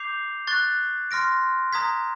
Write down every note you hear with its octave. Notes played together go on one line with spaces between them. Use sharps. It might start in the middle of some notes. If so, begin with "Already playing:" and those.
Already playing: D6 G6 C7 F7
C#6 F#6 A6
C6 F6 A#6 D7
A#5 D#6 G#6 B6